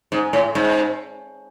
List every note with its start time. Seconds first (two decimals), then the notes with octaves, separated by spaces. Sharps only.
0.12 G#2
0.33 A2
0.55 G#2